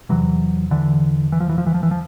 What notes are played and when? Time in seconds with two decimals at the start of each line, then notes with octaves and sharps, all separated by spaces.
0.09 E2 C3 E3 F#3
0.71 D3 E3
1.32 E3
1.40 F3
1.49 E3
1.58 F3
1.66 E3
1.74 F3
1.83 E3
1.91 F3